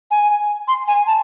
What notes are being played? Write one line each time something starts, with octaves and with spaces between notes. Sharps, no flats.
G#5
C6
G#5
A5